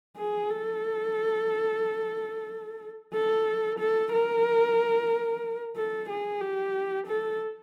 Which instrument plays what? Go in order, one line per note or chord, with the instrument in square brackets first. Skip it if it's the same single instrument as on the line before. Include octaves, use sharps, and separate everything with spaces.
[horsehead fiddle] G#4
A4
A4
A4
A#4
A4
G#4
G4
A4